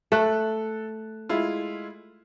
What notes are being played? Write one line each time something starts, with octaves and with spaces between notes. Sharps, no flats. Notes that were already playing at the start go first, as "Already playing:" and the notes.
A3 A4 F#6
G#3 E4 F4